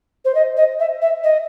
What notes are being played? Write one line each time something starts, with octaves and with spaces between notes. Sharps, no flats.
C5
D#5
D#5
E5
E5
D#5